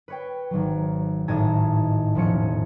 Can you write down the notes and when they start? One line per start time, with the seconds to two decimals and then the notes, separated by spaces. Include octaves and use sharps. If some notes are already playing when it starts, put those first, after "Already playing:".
0.08 B4 C#5 G5
0.50 G#1 F#3
1.28 G#1 A2 D#5 A5 G#6
2.15 E1 F3 C#4 C#7